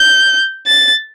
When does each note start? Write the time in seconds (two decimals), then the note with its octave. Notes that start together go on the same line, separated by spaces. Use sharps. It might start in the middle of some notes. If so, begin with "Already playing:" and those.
Already playing: G6
0.66 A6